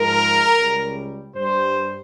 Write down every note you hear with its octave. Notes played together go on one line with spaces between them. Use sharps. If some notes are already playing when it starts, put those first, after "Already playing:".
Already playing: G#2 F3 G#3 A#4
C#2 C#3 G3
G2 G3 C5